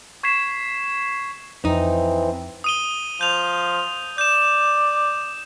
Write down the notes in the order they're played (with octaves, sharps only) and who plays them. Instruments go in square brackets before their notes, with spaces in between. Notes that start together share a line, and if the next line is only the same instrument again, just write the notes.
[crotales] C#6 G#6 B6 C7 E7
[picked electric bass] F2 [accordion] E3 C4 [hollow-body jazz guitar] D#4
[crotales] D#6 D#7 G7
[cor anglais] F3 [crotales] G6 F7
[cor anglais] D5 [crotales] G6 E7